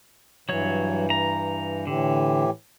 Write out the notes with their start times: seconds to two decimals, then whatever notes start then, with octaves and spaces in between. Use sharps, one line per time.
0.49 G2 E3 F#3 C#5
1.10 A#5
1.87 A2 D3 E3 G4